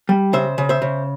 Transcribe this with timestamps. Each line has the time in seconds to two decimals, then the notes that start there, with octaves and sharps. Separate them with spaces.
0.09 G3
0.33 C#3 C5 E5
0.58 C#3
0.69 C5 E5
0.82 C#3